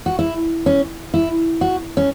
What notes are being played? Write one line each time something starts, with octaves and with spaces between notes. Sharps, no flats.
F#4
E4
C#4
E4
F#4
C#4